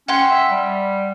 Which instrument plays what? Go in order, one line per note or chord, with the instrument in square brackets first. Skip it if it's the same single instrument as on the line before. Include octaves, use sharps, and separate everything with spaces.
[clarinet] C#4 [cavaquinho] F#5 G5 C6
[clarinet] E5
G3